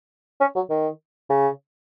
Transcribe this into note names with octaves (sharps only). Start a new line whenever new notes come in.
C#4
F#3
D#3
C#3